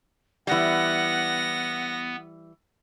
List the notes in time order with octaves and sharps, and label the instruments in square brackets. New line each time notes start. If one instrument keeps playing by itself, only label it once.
[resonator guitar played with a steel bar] E3 G3 [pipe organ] B3 [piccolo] F#5 [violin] A#6